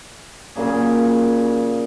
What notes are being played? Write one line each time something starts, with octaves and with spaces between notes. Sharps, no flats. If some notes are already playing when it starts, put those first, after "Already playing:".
A#2 C#3 F#3 G#4